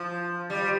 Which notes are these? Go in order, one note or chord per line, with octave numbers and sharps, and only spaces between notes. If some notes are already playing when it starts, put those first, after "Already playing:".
Already playing: F3
G3